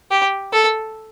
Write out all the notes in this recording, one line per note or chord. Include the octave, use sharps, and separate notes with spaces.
G4
A4